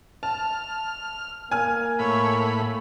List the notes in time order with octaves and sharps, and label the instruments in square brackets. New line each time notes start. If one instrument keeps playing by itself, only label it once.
[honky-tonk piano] A5 [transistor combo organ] F6
[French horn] A#3 [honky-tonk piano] G#5 F6
[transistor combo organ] A2 B5 [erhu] C#5